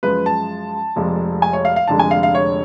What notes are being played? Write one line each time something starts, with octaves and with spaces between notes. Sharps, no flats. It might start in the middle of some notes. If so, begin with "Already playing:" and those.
F#2 F3 G#3 B4
A5
F1 F2 F3 G#3
G#5
C#5
F5
F5
F1 F2 D3 G#3 A5
G#5
F5
F5
C#5